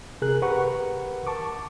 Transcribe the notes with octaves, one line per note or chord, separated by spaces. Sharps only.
C3 G#4 A#4 F#6
G4 A#4 B4 F#5 C#6
A5 C#6 D6